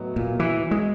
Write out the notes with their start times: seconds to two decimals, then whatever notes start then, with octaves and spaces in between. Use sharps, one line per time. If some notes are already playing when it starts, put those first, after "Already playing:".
Already playing: A2 F#3 B3 D#4
0.16 A#2
0.39 E3
0.71 G#3